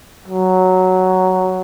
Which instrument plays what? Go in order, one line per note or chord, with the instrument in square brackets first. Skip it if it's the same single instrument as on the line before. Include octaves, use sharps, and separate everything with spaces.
[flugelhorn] F#3